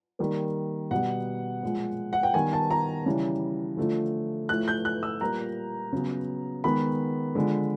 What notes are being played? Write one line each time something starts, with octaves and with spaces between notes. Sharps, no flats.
D#3 G3 A#3
B2 G3 B3 F#5
A#2 F3 G#3
F#5
G5
D#3 G3 B3 G#5
A5
A#5
C#3 E3 G3
D3 F3 A3
A2 F3 A3 F#6
G6
F#6
E6
A#2 G3 A#3 A#5
C#3 F#3 B3
D#3 G#3 B3 B5
D3 F3 G#3